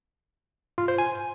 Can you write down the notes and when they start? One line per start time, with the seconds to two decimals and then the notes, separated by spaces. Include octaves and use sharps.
0.78 F4
0.88 C5
0.98 G#5